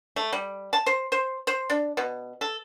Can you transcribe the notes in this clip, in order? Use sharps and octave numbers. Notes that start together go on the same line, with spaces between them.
A3
G3
A5
C5
C5
C5
D4
B2
A4